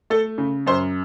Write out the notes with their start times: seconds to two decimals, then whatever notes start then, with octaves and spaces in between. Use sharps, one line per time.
0.10 A3 A4
0.38 C#3
0.66 F#2 C5